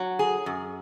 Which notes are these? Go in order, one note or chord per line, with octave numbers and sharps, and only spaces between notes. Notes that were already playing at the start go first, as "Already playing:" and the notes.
Already playing: F#3
G#4
F#2